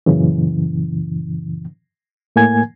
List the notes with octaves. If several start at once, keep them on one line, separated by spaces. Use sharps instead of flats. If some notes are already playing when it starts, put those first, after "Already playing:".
F#2 A#2 C#3 E3
A2 A#3 G#5 G#6